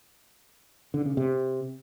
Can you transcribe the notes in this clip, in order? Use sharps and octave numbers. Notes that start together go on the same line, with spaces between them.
D3
C#3
C3